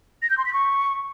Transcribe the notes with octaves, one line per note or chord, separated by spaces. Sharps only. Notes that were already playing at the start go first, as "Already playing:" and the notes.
A#6
G6
C6
B6
C#6